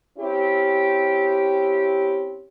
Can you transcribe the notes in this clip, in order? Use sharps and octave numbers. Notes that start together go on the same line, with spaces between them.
C4 C#4 E4 G4